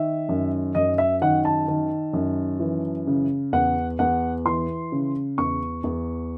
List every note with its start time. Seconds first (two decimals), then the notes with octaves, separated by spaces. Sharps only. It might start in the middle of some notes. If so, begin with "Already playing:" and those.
Already playing: D#3 E5
0.29 F#2
0.75 F#2 D#5
0.98 E5
1.22 D#3 F#5
1.45 A5
1.68 D#3
2.13 F#2
2.60 E3
3.07 C#3
3.53 E2 F#5
3.99 E2 F#5
4.45 E3 C6
4.92 C#3
5.38 E2 C#6
5.84 E2